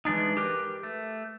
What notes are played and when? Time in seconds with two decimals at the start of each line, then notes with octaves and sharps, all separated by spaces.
0.05 E3 G#3 D4 D#4
0.37 G4 A#4 B4
0.83 A3